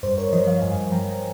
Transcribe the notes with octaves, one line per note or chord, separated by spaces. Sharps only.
G2 C5
A#4 C#5
F3 C5 D#5
C#5 F5
G2 F5 G#5
F3 G5 A#5